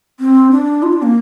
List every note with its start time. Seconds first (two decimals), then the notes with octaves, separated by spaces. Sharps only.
0.20 C4
0.51 D4
0.83 F4
0.93 D4
1.03 A#3